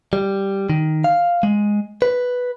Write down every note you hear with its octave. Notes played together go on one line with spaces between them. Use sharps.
G3
D#3
F5
G#3
B4